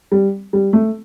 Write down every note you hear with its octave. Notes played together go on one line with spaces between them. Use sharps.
G3
G3
A3